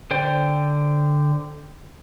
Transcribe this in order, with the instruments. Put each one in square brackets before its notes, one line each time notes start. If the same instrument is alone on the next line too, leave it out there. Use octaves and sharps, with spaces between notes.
[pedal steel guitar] D3 C5 D5 G5